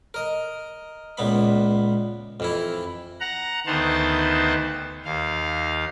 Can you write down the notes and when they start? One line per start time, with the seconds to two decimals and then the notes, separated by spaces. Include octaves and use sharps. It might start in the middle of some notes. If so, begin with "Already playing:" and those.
0.14 A#4 D#5
1.18 C#2 A#2 B3 B5
2.40 F2 E3 E4
3.20 F#5 A#5
3.67 D2 D#3 B3 C5 A5
5.05 D#2 F5